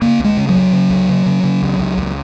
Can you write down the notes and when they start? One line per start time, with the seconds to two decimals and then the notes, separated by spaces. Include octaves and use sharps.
0.02 C#3 A#3
0.19 C#2 G#3
0.37 C#3
0.49 F#3
0.55 C#2
0.72 C#3
0.90 C#2
1.09 C#3
1.26 C#3
1.43 C#3
1.62 C#2
1.79 C#2
1.98 C#2